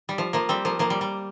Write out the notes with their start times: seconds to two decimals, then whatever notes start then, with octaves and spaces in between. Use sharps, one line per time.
0.09 G3
0.18 F3
0.33 F3 A#3
0.49 G3 C4
0.65 F3 A#3
0.79 F3 A#3
0.90 G3
1.01 G3